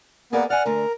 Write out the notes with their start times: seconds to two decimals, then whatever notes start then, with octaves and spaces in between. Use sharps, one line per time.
0.33 A#3 B3 G#4 A#4 D5
0.50 D5 F#5 G#5 F6
0.66 D3 A3 A#4